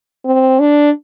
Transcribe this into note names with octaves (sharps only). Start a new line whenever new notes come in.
C4
D4